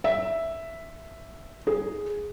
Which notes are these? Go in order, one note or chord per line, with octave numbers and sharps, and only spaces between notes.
E5
G#4